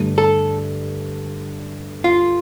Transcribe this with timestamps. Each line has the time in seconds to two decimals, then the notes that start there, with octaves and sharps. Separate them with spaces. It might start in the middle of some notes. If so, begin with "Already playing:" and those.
Already playing: G2 D3 A3
0.18 A4
2.04 F4